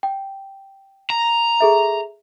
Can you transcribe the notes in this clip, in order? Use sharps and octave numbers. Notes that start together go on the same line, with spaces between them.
G5
A#5
G#4 A4 E5